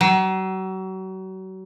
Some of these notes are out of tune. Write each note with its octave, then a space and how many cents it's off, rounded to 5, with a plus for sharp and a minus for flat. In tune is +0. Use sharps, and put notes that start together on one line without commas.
F#3 +35